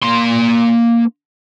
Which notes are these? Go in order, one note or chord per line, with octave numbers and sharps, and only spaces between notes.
A#3 C6